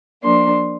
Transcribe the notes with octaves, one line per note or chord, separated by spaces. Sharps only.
F3 A#3 D4 C6